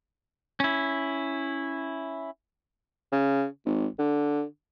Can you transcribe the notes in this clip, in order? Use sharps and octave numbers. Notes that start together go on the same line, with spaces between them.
C#4 E4
C#3
G#1
D3